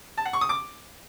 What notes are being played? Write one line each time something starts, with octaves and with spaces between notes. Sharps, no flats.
A5
F#5
C#6
D#6
D6